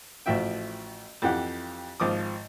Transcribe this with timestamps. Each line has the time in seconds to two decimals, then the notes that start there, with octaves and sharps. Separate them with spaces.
0.26 A1 F3 F#4 E5 G5
1.22 F2 E3 G4 F#5
2.00 G#1 F3 D6 D#6